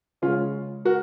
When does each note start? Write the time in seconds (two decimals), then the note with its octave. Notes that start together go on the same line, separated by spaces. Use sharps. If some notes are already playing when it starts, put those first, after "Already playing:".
0.22 C#3 G#3 C#4 F4
0.85 F#4 A#4